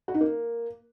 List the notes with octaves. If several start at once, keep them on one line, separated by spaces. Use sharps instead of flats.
F#4
D#4
A#3